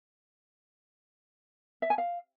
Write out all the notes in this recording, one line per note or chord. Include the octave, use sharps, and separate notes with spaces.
E5
G#5
F5